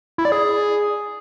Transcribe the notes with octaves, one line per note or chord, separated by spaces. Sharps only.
E4
D5
G#4